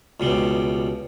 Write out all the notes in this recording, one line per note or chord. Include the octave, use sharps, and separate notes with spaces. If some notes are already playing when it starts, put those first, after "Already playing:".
C#2 B2 G3